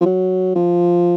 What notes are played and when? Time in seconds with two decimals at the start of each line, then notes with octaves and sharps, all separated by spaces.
0.01 F3
0.06 F#3
0.55 F3